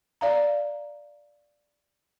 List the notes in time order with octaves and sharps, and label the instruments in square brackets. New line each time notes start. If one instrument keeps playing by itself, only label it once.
[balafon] D5 F5 A#5